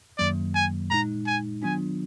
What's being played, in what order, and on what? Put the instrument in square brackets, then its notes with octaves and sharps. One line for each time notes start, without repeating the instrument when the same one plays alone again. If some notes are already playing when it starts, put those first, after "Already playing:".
[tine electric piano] F#2 D#3 F#3 A#3 [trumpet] D5
[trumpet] G#5
[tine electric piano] A#2 G#3 D#4 [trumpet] A#5
[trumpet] G#5
[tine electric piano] D#3 F#3 B3 D4 F4 [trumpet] G#5